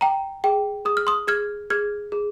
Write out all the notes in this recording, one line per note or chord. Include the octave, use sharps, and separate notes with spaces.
G5 A#5
G#4 G5
G#4 D#6
F6
C6 D#6
G#4 F6 G#6
G#4 F6 G#6
G#4